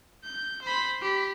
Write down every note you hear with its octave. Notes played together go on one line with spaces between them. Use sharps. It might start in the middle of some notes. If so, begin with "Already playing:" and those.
G6
C5 B5
G4 B5